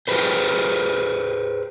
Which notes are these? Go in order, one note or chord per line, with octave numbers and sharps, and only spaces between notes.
G4 G#4 B4 C5